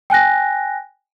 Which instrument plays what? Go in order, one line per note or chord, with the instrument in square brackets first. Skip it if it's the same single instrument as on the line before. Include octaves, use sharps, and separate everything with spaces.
[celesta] G5 G#5 F#6 A#6